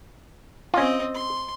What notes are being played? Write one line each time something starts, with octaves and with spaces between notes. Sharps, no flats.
C4 C#4 F4 D#5
C6